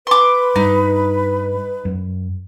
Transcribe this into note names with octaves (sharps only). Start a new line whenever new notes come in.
B4 C6 D6
G2 D#4
F#2